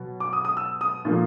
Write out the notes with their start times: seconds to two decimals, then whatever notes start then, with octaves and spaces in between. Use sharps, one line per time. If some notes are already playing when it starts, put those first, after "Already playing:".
Already playing: B2 F#3 B3
0.20 D6
0.33 D#6
0.45 D#6
0.57 E6
0.81 D#6
1.05 A#2 F3 A#3